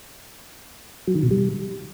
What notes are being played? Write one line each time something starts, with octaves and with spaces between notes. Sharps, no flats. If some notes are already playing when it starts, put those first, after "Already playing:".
F#3
D#3
B2
G3